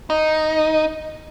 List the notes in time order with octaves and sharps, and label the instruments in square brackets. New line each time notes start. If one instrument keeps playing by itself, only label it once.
[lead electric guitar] D#4